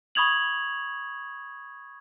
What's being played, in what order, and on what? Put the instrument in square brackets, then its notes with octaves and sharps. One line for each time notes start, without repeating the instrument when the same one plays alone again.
[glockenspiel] B5 C#6 D#6 G#6 F7 F#7